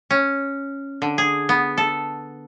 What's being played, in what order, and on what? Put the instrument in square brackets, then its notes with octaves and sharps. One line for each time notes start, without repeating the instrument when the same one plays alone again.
[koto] C#4
D3
G#4
B3
A4